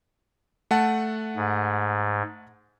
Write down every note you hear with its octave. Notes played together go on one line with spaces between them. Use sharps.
A3 F#5 A5
G#2